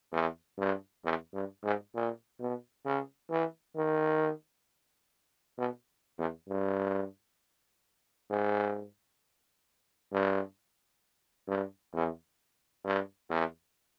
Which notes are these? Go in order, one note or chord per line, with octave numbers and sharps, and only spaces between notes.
E2
G2
E2
G2
G#2
A#2
B2
C#3
E3
D#3
B2
E2
G2
G#2
G2
G2
E2
G2
E2